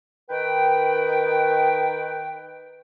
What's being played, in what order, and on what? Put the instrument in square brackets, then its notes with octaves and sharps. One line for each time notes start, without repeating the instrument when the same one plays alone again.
[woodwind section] D#3 B4 G5